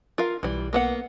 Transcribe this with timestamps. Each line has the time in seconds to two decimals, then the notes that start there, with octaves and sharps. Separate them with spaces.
0.18 F4 A#4 F5
0.43 B1 E3 G3
0.73 A#3 B3 F#5